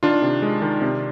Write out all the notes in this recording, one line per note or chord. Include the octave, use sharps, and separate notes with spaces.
D#3 D4 F4
C3
G#3
D#3
C3